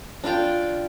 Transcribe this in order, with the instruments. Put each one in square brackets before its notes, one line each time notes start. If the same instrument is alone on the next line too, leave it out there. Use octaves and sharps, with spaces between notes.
[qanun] D4 F4 F5 G5